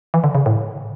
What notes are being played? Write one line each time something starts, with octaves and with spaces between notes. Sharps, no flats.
E3
D3
C#3
A2